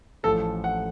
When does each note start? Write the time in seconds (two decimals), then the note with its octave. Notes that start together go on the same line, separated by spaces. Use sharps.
0.23 A1 A2 F3 A3 A4
0.64 F#5